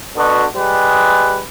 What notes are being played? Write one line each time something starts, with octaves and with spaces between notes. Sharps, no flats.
B2 D3 F#4
G3 G#3 B4